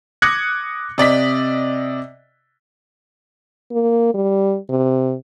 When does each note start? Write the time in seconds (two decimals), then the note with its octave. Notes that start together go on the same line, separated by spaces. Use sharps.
0.22 D6 D#6 F#6 G#6 A#6 C#7
0.98 C3 D5 D#5 B6
3.72 A#3
4.14 G3
4.69 C3